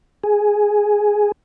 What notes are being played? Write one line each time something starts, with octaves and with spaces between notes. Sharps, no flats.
G#4